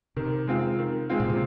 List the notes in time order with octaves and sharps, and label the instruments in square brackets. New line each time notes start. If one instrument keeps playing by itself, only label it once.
[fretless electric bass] C3 [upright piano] D#3
[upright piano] G#3 C4 F4
D#3
G#3 C4 F4
[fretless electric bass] A#2
C3